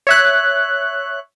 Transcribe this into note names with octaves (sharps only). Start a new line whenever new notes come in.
C#5 E5 F#6